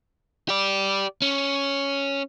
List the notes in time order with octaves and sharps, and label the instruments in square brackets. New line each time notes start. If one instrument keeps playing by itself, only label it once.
[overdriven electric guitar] G4 D5
C#4